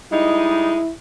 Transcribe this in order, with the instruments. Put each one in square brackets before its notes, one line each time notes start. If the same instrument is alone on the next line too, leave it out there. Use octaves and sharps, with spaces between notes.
[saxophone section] G3 G#3 D#4 [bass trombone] E4